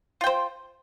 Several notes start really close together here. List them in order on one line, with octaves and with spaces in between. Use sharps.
F4 G5 C5